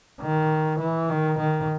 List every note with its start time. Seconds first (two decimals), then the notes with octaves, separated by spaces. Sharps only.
0.22 D#3
0.80 E3
1.10 D#3
1.39 D#3